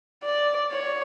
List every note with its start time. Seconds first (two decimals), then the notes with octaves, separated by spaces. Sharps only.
0.24 D5
0.71 C#5